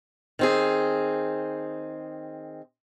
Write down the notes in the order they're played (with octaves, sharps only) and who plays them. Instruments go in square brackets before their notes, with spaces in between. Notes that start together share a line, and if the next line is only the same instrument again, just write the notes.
[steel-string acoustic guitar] D#3 C4 G#4